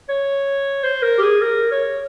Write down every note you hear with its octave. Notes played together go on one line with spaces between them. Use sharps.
C#5
C5
A#4
G4
G#4
A#4
C#5